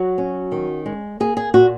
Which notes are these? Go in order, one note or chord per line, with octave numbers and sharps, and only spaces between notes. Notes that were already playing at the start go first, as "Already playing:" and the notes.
Already playing: F#3 F#4
C#4
D#3
G#3
A#3 G#4
G#4
A#2 F#4